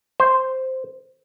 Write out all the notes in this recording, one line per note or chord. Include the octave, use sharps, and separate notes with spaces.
C5